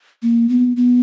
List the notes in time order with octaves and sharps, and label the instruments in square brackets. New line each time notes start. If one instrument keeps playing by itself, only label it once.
[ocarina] A#3
B3
B3